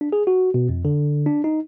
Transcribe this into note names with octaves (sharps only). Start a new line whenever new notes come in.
D4
G#4
F#4
B2
F2
D3
D4
D#4